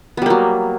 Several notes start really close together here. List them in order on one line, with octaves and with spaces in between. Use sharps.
B3 G3 A#3 F#3